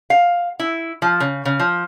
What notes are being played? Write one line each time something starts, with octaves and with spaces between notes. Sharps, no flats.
F5
E4
F3
C#3
C#3
F3